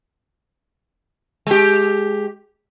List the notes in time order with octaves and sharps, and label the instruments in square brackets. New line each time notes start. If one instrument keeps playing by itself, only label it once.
[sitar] G#3 G4